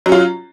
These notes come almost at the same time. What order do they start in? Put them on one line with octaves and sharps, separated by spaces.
F#3 C#4 F4